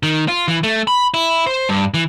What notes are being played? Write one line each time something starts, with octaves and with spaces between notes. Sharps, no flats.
D#3
F4
E3
A3
B5
E4
C5
G2
E3